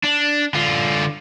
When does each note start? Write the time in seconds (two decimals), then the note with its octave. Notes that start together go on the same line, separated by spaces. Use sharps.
0.04 D4
0.55 D3 F4